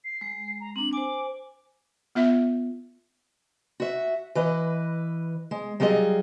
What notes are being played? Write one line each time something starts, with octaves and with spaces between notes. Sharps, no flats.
C7
G#3
A#5
C4 D4 F#7
C5 G#5 D6
B3 F4 E5
F#4 E5
E3 B4 D#5
G#3
F#3 G3 F4 G#4 D#5